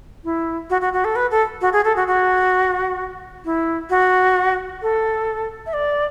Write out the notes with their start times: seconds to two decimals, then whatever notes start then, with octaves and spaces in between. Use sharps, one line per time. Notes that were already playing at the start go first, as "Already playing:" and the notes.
0.24 E4
0.70 F#4
0.81 F#4
0.93 F#4
1.05 A4
1.16 B4
1.31 A4
1.61 F#4
1.73 G#4
1.85 A4
1.96 F#4
2.08 F#4
3.45 E4
3.90 F#4
4.82 A4
5.66 E5
5.73 D5